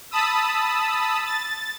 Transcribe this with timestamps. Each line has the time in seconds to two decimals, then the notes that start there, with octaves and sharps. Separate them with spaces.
0.11 A5 B5 D#6 E6
1.25 A6